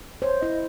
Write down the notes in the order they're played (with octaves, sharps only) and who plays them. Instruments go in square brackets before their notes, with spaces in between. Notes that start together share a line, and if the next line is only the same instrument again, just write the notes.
[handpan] C5 [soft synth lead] C#5
[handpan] E4 [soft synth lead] D#5